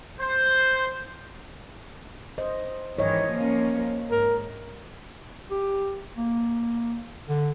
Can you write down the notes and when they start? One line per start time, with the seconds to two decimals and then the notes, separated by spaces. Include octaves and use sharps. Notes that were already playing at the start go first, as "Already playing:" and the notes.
0.20 C5
2.38 C5 D#5
2.99 G#2 D#3 E3 C#5 D#5
3.32 F3 A#3 C#4
4.11 G#2 A#4
5.51 G4
6.17 A#3
7.29 D3